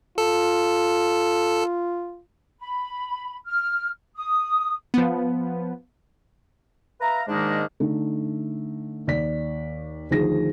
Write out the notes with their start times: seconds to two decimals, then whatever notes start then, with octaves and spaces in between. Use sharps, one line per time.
0.18 F4 A4
2.59 B5
3.46 F6
4.15 D#6
4.94 F3 B3
7.01 B4 E5 F5 A#5
7.28 G#2 D#3 G#3 A#3 D4 D#4
7.80 D3 A3 D#4
9.07 D#2 D5 B6
10.10 D2 D#3 F3 G#4 A#6